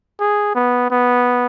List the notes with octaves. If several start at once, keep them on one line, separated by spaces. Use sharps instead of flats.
G#4
B3
B3